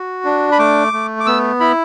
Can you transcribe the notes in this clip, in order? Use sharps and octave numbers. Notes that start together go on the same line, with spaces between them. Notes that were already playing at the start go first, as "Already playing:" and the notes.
Already playing: F#4
D4
B5
A3 D6
A3
D6
B3 E6
E4 B5